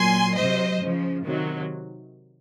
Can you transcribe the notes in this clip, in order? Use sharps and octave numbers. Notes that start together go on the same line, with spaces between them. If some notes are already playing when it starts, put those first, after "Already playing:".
Already playing: A#2 F#3 G#5 C6
C3 F#3 C5 D#5
C#3 F3
C3 D#3 F#3